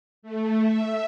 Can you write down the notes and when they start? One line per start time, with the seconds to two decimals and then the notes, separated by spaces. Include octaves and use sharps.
0.22 A3
0.61 E5